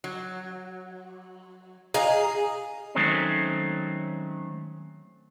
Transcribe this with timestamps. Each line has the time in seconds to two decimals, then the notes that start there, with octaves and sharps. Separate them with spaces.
0.04 F#3
1.94 G#4 D#5 F5 A#5
2.95 D#3 F#3 G#3 A3 C4 C#4